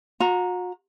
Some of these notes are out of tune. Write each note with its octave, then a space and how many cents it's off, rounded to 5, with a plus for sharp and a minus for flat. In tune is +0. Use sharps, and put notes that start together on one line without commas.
F#4 -40 A#5 +0